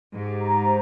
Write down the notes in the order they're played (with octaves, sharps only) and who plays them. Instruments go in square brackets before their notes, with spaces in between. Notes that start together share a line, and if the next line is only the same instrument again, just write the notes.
[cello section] G#2 [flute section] G4
[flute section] A#5
C5